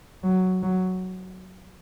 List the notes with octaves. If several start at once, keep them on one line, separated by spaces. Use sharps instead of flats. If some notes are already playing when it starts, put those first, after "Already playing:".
F#3
F#3